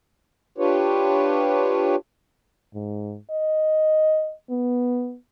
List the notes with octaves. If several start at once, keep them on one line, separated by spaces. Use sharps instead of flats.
D4 F4 G4 B4 C#5
G#2
D#5
B3